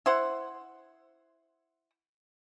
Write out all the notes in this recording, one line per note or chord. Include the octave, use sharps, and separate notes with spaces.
E4 C5 F#5